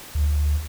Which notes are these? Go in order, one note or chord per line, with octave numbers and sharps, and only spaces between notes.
D2